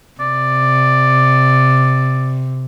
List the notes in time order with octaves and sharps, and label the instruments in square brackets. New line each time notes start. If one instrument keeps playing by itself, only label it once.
[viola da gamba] C3 [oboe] D5